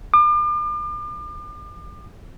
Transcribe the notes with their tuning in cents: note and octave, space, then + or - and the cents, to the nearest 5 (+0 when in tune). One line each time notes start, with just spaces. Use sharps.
D6 +40